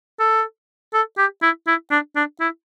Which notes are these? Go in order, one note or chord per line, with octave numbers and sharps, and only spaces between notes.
A4
A4
G4
E4
E4
D4
D4
E4